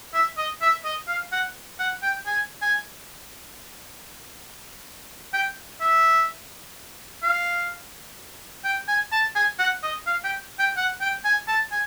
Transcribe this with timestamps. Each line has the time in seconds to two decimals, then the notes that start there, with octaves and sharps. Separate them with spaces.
0.14 E5
0.37 D#5
0.61 E5
0.84 D#5
1.08 F5
1.32 F#5
1.79 F#5
2.03 G5
2.26 G#5
2.62 G#5
5.33 G5
5.81 E5
7.23 F5
8.64 G5
8.88 G#5
9.12 A5
9.35 G#5
9.59 F#5
9.83 D#5
10.07 F5
10.24 G5
10.59 G5
10.77 F#5
11.01 G5
11.25 G#5
11.48 A5
11.72 G#5